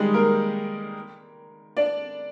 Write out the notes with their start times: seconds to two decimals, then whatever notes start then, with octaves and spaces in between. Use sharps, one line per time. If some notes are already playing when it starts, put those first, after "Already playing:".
Already playing: D#3 G3 G#3 D#4 G4 G#4
0.14 A#3 A#4
1.77 D4 D5